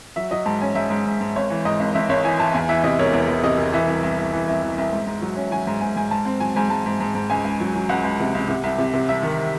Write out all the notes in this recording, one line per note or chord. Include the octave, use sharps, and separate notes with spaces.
F#3 E5
F#3 D#5
G#2 A5
C#4 G#5
G#2 E5
G#2
G#2
G#2
G#1 C#5
E3
G#2 D#5
G#1
G#1 E5
G#1 C#5
E3 G#5
E3 A5
E2 G#5
E3 E5
C3 D#5
E1 C#5
E2 C#5
E2
C3 D#5
E1
E3 E5
C2
C2
C2
E3
C2
E3
C2
G#2
G#2
F#3
C#4
F#3 G#5
G#2
G#2 G#5
G#2 G#5
G#2 A5
C4
F#3 G#5
G#2 G#5
G#2 A5
G#2
G#2
G#2
C#2 G#5
C#2
F#3
F#3
C#2 F#5
C#2
C3
C#2
C3
C2
C3
C3
C2 E5
D#3